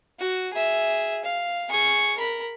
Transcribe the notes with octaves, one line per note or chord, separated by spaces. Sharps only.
F#4
G#4 E5
F5
G#4 C#6
A#4 B5